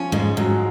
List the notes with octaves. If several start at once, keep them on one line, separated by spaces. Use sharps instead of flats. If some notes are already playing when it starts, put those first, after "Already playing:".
Already playing: F3 C#4
G#2 G#3
G#2 F#3